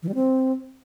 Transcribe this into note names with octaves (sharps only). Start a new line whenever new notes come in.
E3
G3
C4